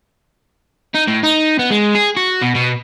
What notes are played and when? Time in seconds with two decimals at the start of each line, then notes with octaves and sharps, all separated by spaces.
0.94 D#4
1.07 A2
1.23 D#4
1.59 B3
1.70 G#3
1.95 G#4
2.17 F#4
2.41 B2
2.55 B2